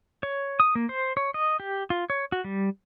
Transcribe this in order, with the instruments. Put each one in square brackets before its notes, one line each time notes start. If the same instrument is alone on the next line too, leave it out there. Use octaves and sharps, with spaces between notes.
[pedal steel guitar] C#5
D#6
A#3
C5
C#5
D#5
G4
F4
C#5
F#4
G3